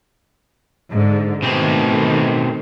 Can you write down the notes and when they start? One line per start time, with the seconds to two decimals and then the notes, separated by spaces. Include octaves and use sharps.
0.92 G#2 D3
1.42 B2 D#3 A3 C4